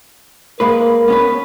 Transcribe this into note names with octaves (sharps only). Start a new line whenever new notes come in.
G#3 A#3 A#4 B4
B3 C#4 B4